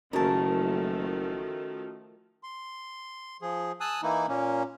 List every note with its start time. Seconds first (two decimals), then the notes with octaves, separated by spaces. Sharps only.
0.13 F#1 D#3 F3 A3 C#4 F#4 A#4 A5
2.43 C6
3.42 F3 G#4
3.81 G#5 A5 D#6 E6 F#6
4.03 E3 A#3 D#4 E4
4.28 A#2 A#3 C#4